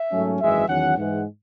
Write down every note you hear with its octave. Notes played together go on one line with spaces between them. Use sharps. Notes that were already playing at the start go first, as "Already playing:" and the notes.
Already playing: E5
G#2 F#3 A3 C#4
G#1 F#2 E3 G#3 E5
E2 D#3 F#3 C#4 F#5
G#2 E3 G#3 F#5